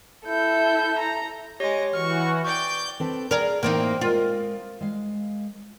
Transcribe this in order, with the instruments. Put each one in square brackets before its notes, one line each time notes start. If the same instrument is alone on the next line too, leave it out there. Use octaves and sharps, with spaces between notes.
[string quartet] E4 A4 G6
A#5
[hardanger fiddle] G#3 D#5 [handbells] G4 C#5 A#6
[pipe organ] E3 F#4 [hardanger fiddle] C#6 [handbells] F6
[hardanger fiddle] D5 G5 [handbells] C#6 [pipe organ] G6
[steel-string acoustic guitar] C4 A4 B4
[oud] G#4 A#4 [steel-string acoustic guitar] D5
[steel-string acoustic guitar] A2 E3 [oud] A#3 C4 D#4
[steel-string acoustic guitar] G#3 A#4 D#5 [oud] F4
[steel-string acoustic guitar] G#3 F5